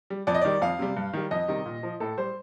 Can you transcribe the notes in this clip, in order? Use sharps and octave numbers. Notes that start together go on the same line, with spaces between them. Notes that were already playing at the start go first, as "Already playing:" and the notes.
G3
F2 D5
D#5
D#3 G3 D5
F2 F5
C3 G3
G2
D#3 G3
F2 D#5
C3 D#3 G3
A#2
F3
A2 A4
G3 C5